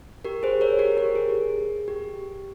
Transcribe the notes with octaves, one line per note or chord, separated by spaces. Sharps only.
G4 A#4
G#4 C5
A#4 C#5
G4 A#4
G4 A#4
G#4
G4